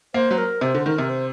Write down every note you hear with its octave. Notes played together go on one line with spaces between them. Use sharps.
A#3 C5
F#3
A#4
C3 C5
D3
D#3 A#4
C3
C5